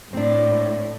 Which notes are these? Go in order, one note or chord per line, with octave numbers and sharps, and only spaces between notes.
A2 C4 D4